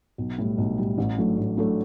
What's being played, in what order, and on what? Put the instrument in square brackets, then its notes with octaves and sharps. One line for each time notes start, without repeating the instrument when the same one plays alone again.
[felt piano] B1
A2 G3
B1
A2 G3
A1
A2 F#3 A3 D4
A1
A2 F#3 A3 D4